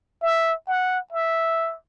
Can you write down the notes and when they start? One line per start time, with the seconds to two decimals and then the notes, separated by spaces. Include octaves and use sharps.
0.22 E5
0.68 F#5
1.13 E5